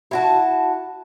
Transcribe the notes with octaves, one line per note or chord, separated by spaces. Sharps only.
E4 F#4 A5